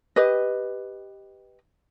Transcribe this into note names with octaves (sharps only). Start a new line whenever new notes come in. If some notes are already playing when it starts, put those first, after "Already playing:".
G4 B4 D#5